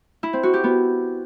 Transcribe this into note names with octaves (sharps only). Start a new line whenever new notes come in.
E4
C4
F#4
G4
B3